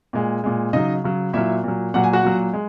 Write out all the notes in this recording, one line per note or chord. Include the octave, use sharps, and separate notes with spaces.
A#2 G#3
A#2 G#3
C#3 F#3 D#4 D#5
C#3 F#3
A#2 F#3 E4 E5
A#2 F#3
A#2 F#3 F#5
G#5
F#4 F#5
A#2 F#3
G#3